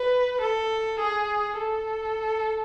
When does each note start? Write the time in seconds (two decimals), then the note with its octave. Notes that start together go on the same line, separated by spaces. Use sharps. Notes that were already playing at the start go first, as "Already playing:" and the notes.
Already playing: B4
0.41 A4
0.99 G#4
1.58 A4